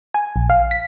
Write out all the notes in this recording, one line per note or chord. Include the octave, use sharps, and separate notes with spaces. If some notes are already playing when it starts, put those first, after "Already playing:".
G#5
A#1
F5
B6